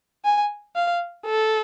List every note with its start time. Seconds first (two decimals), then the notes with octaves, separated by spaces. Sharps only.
0.25 G#5
0.76 F5
1.26 A4